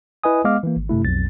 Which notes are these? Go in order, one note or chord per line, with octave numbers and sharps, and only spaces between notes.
E4 B4 D#5 G#5 D#6
G#3 B3 D#5 F5 D6 F6
E3 A#3
G#1
G2 C3 A3 E4
B1 F2 A6